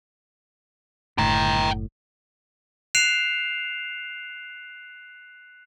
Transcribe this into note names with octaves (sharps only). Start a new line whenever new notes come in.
F#1 A2 G5 A#5
F#6 C7 D7 E7 F7